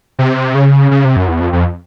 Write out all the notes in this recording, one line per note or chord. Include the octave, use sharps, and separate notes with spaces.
C3
C#3
C#3
C3
F#2
E2
F2
F2